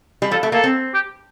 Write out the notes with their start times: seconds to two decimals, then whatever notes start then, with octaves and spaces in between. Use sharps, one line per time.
0.22 G3
0.31 F3 A4
0.43 A3
0.52 A#3 A4
0.64 C4
0.94 G4